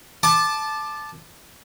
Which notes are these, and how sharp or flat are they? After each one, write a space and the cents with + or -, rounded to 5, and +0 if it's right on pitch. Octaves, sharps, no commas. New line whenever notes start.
A5 -15 D6 +15